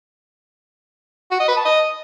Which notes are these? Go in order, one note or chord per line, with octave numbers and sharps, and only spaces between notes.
F#4
D#5
B4
A5
D#5